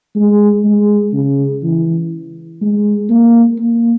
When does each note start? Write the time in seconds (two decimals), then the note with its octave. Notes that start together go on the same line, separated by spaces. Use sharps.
0.16 G#3
0.65 G#3
1.13 C#3
1.63 E3
2.61 G#3
3.09 A#3
3.59 A#3